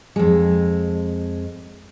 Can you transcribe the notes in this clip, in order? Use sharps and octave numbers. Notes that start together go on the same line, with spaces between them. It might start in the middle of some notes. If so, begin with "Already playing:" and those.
F2 G#3